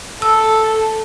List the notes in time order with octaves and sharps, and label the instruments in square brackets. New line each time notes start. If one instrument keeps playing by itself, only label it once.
[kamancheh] A4 [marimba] E6